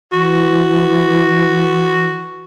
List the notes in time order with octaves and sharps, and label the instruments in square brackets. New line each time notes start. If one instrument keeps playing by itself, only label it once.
[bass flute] E3 [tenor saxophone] F#4